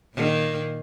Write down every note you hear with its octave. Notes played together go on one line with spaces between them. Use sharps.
A#2 D#3 A#3